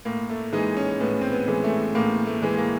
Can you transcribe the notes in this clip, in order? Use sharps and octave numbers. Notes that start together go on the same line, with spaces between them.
A2 A#3
A3
E3 G#3 D#4
C#4
A2 B3
C4
B3
E3 G#3
A3
A2 A#3
A3
E3 G#3
A#3